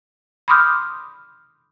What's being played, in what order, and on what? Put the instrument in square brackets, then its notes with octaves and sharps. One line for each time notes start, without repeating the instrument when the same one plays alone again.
[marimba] B5 C6 D6 D#6 F6 G6